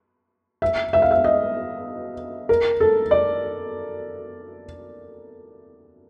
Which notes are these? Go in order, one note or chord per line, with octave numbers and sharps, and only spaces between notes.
E5
E5
F5
E5
D#5
A#4
A4
D5